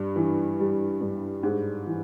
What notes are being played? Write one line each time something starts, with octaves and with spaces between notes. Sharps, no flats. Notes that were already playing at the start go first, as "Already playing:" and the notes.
Already playing: G2
E3
G3
G2
G#2
E3